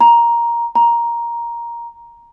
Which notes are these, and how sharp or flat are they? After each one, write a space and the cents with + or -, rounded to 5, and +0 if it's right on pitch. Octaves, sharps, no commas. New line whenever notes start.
A#5 +10
A#5 +10